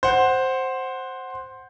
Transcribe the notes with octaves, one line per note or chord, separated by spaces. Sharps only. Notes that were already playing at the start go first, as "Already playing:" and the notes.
C5 F#5